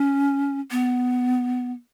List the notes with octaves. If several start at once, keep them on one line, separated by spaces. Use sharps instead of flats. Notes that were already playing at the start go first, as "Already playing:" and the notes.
Already playing: C#4
B3